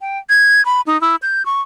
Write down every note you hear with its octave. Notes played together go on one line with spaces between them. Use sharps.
G5
G#6
B5
D#4
E4
G6
C#6